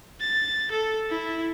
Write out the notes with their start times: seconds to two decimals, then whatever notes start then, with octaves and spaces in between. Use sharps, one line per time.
0.21 A6
0.71 A4
1.11 E4